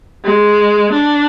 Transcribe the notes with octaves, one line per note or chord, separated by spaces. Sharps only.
G#3
D4